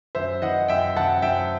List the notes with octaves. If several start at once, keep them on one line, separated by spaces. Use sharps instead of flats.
F#2 C5 E5
E3 D#5 F#5
F#2 E5 G5
F#2 F#5 A5
F#2 E5 G5